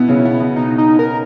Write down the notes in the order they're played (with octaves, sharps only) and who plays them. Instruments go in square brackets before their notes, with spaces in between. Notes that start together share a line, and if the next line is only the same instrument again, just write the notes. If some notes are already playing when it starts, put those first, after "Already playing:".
Already playing: [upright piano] B2 B3 [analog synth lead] E4
[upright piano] C#3 C#4
B2 B3
B2 B3
[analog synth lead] D#4
D#4
A#4